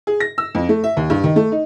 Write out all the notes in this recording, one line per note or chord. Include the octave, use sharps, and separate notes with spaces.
G#4
A#6
E6
F2
A3
E5
D#2
G2
D#3
A3
D#4